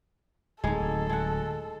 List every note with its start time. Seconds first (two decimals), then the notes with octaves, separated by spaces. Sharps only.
0.64 D1 G#3 D#4 A4
1.10 G#3 F#5